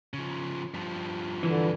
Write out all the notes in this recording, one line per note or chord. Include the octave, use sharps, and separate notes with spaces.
C#3 F3
G2 F3
D3 E3